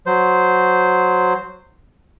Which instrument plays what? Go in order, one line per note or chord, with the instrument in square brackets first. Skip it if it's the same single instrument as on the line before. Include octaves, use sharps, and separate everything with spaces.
[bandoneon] F#3 C5